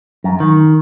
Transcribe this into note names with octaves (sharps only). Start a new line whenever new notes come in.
F#2
D#3